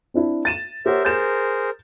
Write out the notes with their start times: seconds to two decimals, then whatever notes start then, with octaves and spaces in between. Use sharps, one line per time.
0.14 C4 D4 E4
0.45 A6 D#7 E7
0.86 G4 A#4 C5 C#5 E5 F#5
1.05 G#4 A#4 C5 G6 A6 E7